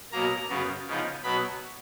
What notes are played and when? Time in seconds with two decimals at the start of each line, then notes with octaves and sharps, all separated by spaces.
0.12 B2 F#3 A#3 A#5
0.49 F#2 C#3 F#3 B3
0.87 C#3 F3 B3 D#4
1.23 B2 F#3 B3 B5